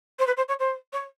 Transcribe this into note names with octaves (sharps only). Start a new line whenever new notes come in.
C5
B4
C5
C#5
C5
C#5